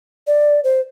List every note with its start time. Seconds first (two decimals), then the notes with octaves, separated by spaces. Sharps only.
0.27 D5
0.64 C5